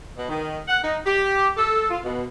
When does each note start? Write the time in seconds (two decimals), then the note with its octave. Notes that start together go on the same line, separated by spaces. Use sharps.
0.17 B2
0.29 D#3
0.68 F#5
0.83 D#4
1.05 G4
1.57 A4
1.90 F4
2.04 B2